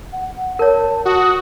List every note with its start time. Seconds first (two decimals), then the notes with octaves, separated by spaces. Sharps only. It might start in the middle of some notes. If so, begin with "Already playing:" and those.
0.12 F#5
0.59 A#4 C#5 A5
1.05 F#4 D#6